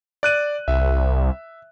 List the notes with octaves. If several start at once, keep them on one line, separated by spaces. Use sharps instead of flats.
D5 F#6 D#7
C2 E5